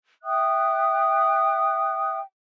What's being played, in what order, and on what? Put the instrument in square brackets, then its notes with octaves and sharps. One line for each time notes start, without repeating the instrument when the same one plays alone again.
[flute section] E5 G5 D#6 F#6